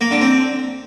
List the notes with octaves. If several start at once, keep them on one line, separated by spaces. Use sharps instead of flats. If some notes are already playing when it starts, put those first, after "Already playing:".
A#3
D3
C4